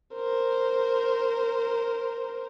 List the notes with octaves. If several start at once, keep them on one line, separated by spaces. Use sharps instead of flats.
A#4 C5